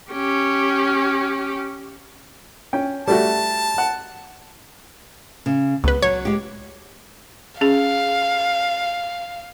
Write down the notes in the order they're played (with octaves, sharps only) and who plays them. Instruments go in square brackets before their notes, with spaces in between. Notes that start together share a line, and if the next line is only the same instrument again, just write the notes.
[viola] C#4 G4
[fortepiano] C#4 G5
[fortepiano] G3 A3 F#4 [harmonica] A5
[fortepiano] F#5
[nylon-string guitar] C#3
[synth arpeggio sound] C#2 B4 [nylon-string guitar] B3
[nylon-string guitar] F#3 [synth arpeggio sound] C#5
[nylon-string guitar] G#3 G4
[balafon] C#4 G#4 [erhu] F5